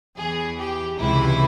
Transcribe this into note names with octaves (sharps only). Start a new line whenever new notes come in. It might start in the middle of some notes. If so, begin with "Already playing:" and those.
E2 E3 G#4
G4
C#2 C3 E3 E4